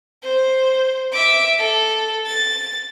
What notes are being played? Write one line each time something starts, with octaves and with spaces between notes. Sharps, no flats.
C5
E5 D6
A4
A6